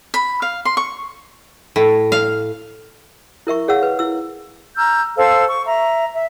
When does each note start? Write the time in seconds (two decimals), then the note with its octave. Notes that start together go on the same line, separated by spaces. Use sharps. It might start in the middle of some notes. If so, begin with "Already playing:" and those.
0.14 B5
0.42 F5
0.65 C6
0.77 C#6
1.76 A2
2.12 F5
3.47 E4 A#4 E5 C#6
3.68 G#4 C#5 F5 F#5 E6
3.83 B4
3.99 E4 E6
4.77 A#5 E6 F6 G6
5.17 A4 C5 F5 E6
5.47 C#6
5.67 E5 A#5
6.14 E5